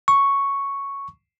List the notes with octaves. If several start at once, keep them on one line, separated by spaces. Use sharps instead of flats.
C#6